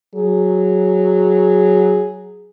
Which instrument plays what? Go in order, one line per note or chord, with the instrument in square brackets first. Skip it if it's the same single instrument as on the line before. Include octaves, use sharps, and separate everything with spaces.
[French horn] F#3 [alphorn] G#4